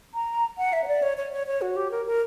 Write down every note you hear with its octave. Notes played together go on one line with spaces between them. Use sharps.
A#5
F#5
E5
C#5
D5
C#5
C#5
C#5
C#5
F#4
G4
A#4
A#4